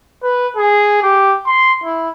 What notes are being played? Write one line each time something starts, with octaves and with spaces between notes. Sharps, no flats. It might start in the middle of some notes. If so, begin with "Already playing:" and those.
B4
G#4
G4
C6
E4